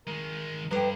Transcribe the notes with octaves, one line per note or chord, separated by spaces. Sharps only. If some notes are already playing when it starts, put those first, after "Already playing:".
D#3 G#3 A#4
G2 G3 A4 B4 G5